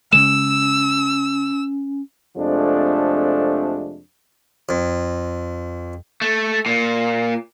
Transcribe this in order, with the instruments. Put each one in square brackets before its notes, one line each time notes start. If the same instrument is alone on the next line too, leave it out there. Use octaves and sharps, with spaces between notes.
[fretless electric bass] C#3 G#3 [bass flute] C#4 [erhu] E6 [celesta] E7
[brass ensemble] F2 C3 F3 G#3 A3 D4
[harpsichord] F2
[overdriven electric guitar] A3
A#2